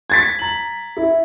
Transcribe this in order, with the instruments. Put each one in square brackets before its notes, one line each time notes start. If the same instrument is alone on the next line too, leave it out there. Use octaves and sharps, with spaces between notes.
[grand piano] G#6 A6 B6
A#5 F#7
E4